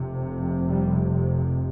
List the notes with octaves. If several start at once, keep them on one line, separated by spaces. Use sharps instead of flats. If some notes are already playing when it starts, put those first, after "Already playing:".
Already playing: F1 F2 C3
G3